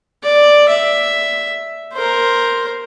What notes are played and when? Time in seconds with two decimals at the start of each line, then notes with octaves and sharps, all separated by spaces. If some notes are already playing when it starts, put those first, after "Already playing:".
0.23 D5
0.69 E5
1.93 A#4 C5